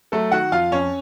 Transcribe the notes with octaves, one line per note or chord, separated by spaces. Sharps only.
F#3 A3 A4
D#3 F#4 F#5
F2 F4 F5
F2 C#4 C#5